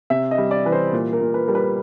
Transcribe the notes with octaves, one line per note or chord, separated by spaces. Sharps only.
C3 E5
D#5
G3
D5
E3 B4
C5
A#2
A#4
A#2
B4
G3 A#4
B4